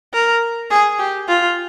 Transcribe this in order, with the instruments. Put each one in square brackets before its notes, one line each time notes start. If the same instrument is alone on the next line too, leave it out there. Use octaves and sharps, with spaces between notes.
[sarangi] A#4
G#4
G4
F4